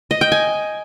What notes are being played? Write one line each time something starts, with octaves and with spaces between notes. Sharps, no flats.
D#5
G5
G#5